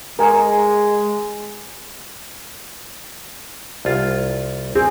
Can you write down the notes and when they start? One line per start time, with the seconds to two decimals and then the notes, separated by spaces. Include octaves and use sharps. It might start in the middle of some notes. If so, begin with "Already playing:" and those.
0.19 G#3 A#4 G#5
3.85 C2 F4
4.76 C4 G#4